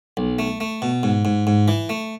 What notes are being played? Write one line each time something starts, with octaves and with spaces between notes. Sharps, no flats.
B1
A3
A3
B2
G#2
G#2
G#2
E3
A3